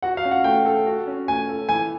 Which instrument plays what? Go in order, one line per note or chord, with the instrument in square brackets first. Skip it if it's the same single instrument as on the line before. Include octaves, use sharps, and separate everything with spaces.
[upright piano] F#4 [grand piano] F#5
[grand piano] F5
[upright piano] C#4
[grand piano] F#5
[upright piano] A3 [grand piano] G5
[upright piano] A4
F#4
C#4
[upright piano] A3 [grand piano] G#5
[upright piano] A4
[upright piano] E3 [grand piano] G#5